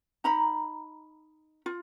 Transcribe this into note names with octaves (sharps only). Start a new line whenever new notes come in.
D#4 A#5 B5
F4